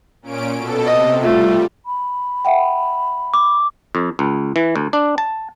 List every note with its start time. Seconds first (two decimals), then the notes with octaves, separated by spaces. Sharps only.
0.22 A#2 C#4 D7
0.55 B2 A4
0.86 C3 D#5
1.23 G3 A3 F4
1.86 B5
2.45 E5 F#5 G5
3.34 D6
3.95 F2
4.19 C#2
4.56 E3
4.76 D2
4.93 D4
5.18 A5